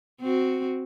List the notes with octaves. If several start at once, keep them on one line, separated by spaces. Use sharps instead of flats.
C4 F#4